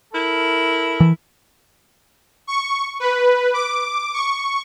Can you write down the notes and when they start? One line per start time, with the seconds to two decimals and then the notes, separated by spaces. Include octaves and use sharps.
0.12 E4 A4 A#4
1.00 E3
2.47 C#6
3.00 B4
3.54 D6
4.14 C#6